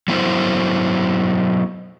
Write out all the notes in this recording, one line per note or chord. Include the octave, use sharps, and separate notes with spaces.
F#3 B3 E4 C5